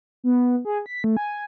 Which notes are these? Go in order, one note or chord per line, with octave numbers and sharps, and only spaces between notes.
B3
G#4
B6
A3
G#5